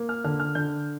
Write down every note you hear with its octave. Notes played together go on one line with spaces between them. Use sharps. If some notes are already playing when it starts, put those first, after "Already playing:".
Already playing: A#3
F6
D3 F6
F6
D3 G6